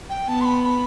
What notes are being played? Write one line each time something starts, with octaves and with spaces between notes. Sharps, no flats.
G5
B3 A5
C6
B5
B5